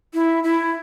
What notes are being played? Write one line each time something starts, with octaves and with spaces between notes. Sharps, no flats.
E4
E4